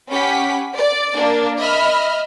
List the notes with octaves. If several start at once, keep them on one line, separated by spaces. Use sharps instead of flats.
C#4 G4 F#5 B5 B6
D5
A#3 D4
D#5 E5 B5 F6